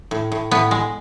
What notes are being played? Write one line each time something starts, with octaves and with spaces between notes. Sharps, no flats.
A2
A2
A2 B3
G#3